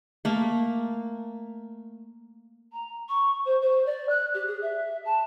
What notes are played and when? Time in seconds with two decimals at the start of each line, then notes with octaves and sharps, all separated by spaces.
0.25 A3 A#3
2.72 A#5
3.09 C#6
3.45 C5
3.61 C5
3.86 D5
4.09 F#6
4.34 G4
4.47 G#4
4.62 E5
5.05 A5